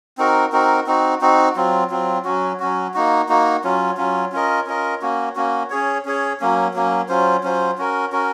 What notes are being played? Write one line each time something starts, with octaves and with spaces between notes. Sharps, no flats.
C4 D#4 F#4 A#4
C4 D#4 F#4 A#4
C4 D#4 F#4
C4 D#4 F#4
F#3 C4 F4
F#3 C4 F4
F#3 C#4 F#4
F#3 C#4 F#4
A#3 D#4 F#4
A#3 D#4 F#4
F#3 C#4 F4
F#3 C#4 F4
C#4 F4 A#4 D#5
C#4 F4 A#4 D#5
A#3 C#4 F#4
A#3 C#4 F#4
C#4 G#4 C#5
C#4 G#4 C#5
F#3 A#3 C#4
F#3 A#3 C#4
F#3 C#4 F4 C5
F#3 C#4 F4 C5
C#4 F#4 A#4
C#4 F#4 A#4